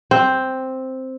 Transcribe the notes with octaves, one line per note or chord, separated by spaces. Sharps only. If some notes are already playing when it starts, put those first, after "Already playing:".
C4